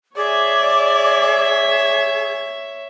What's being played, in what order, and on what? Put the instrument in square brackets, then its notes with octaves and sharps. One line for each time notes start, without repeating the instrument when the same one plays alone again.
[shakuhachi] G#4 [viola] C#5 E5 [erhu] D5